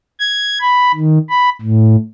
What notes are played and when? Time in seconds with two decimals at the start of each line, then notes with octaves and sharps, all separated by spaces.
0.20 G#6
0.61 B5
0.95 D#3
1.29 B5
1.62 A2